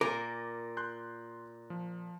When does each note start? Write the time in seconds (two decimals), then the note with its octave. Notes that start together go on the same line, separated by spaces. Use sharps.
0.01 A#2 A#4 D6
0.77 C6 F#6 G6
1.70 F3